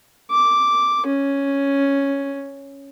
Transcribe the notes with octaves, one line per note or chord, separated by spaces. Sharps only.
D6
C#4